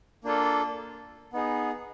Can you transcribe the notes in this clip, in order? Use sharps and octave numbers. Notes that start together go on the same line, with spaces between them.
A#3 D4 F4 A4
B3 D#4 G#4